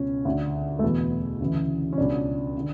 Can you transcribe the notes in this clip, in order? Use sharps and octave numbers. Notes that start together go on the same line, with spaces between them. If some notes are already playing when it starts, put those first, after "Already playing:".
Already playing: C#2 B2 C#4
D2 D3
A3
E2 B2 B3
D2 C#3 E3
C#4
C#2 B2 D4
D3